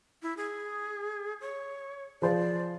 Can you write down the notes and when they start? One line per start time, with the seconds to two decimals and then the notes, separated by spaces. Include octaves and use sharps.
0.23 E4
0.37 G#4
1.41 C#5
2.22 F3 G#4 C5 D5